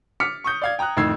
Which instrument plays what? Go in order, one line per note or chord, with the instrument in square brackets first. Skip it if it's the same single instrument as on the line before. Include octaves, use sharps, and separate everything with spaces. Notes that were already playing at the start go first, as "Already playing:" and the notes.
[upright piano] D6 F6 B6 C#7
C#6 D#6 G6
D5 F5 G#6
G5 A#5 D#6 F#6
F2 A2 D#3 E6 G#6 C7